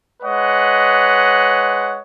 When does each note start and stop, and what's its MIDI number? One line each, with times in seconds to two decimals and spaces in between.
0.23 2.01 56
0.23 2.01 71
0.23 2.01 73
0.23 2.01 75
0.23 2.01 78